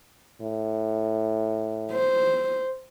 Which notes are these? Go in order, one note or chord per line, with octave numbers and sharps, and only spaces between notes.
A2
C5